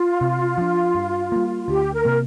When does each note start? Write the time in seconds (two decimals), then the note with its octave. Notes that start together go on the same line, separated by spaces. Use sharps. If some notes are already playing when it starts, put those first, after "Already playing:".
Already playing: F4
0.21 C3
0.58 F3 D4
0.95 G2
1.32 G3 A#3
1.68 D2 G4
1.93 A#4
2.05 C3 A#3